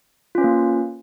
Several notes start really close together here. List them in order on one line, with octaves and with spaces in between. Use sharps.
F4 C#4 B4 A#3